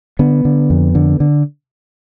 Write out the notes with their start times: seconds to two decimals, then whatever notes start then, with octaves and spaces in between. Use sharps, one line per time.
0.19 D3 B3
0.45 D3
0.70 F2
0.95 D3
1.20 D3